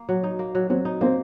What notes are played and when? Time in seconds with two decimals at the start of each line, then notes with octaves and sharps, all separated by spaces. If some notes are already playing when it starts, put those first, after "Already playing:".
Already playing: A#3
0.09 F#3
0.24 D#4
0.39 A#3
0.55 F#3
0.70 F#3 C4
0.85 D#4
1.01 A#3 C4